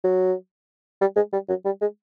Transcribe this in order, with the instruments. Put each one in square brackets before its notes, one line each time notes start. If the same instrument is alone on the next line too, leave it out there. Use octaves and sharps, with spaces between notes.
[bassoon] F#3
G3
G#3
G3
F#3
G3
G#3